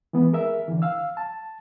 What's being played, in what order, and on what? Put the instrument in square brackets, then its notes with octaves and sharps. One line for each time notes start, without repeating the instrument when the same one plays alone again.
[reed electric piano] E3 G#3 B3
G#4 A#4 E5
D3 E3
F5 E6
A5